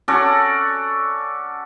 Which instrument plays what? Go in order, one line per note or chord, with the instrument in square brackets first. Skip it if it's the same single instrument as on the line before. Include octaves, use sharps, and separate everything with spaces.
[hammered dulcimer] C#4 F#4 A4 D5